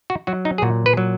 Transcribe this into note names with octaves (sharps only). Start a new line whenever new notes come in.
F#4
F#3 F#4
D#4
G#4
A#2 F#4
B4
F#3